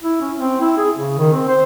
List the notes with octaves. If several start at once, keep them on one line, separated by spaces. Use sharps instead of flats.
E4
C#4
C4
E4
G#4
C#3
D#3
C4
C5